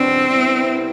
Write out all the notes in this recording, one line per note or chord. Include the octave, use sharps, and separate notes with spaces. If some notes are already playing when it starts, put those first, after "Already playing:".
Already playing: E2 B2 G3 C4 D4
C2 C3 G3 B3 E4